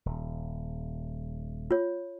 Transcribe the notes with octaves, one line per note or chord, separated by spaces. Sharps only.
D#1
F4 C#5